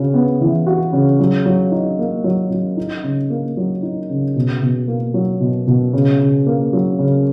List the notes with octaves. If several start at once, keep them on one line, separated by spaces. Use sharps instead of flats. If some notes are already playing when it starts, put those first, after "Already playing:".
Already playing: C#3 F#4
B3
E3
F#4
C#3
F#3
F#3
D#4
A#3
F#3
F#3
D#4
C#3
A#3
F#3
D#4
C#3
B2
B2
A#3
F#3
B2
B2
C#3
C#3
A#3
F#3
C#3